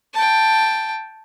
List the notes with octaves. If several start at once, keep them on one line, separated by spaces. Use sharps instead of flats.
G5 A5